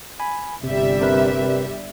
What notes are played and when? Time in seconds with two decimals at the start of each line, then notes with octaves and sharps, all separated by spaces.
0.20 G#5 B5
0.63 G1 C3 G3 E5
1.01 C3 A#4 B4